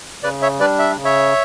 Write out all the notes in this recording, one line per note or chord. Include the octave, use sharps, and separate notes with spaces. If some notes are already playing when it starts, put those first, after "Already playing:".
C#3 B4 D5
C#5 E5
G3 D4 B4 D5
E5
C#3
C#5 E5